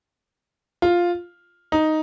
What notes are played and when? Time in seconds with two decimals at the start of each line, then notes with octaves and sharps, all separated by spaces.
0.82 F4
1.72 D#4